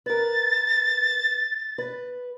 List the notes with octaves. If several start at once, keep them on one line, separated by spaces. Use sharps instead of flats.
A#4 B4 A6
B4